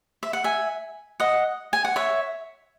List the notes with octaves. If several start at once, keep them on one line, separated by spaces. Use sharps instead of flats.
E5
F#5
E5 G#5
D#5 F#5
G#5
F#5
C#5 E5